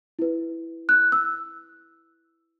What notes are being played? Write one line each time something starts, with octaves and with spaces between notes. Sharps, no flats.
E4 B4
F#6
E6